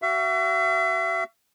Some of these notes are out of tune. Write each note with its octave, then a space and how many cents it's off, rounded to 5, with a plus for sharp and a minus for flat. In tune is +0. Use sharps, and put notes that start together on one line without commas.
F#4 +30 E5 +40